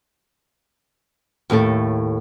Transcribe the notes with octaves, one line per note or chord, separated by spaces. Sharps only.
D#2 A2 E4 A4